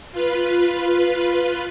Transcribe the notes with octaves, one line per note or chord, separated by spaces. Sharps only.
F4 B4